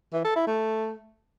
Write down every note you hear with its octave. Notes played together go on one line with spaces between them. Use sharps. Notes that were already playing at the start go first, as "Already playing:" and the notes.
E3
A4
E4
A3